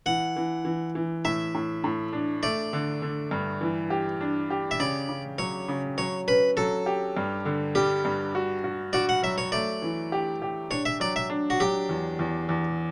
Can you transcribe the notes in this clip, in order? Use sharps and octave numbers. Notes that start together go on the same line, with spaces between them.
E3 F#5
E3
E3
E3
A2 E5
A2
A2
D4
A3 D5
D3
D3
G2
E3
G4
D4
G4
E5
C#3 D5
C#3
F#3 C#5
C#3
F#3 C#5
C#4 B4
F#3 A4
G4
G2
D3
G3 G4
G2
F#4
F#4
F#4 D5
F#5
F#3 E5
C#5
A3 D5
E3
G4
G4
D4 C#5
E5
F#3 D5
E5
D4
F#4
F#3 G4
E2
E2
E2